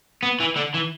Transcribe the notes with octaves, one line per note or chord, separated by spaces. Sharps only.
B3
E3
D3
E3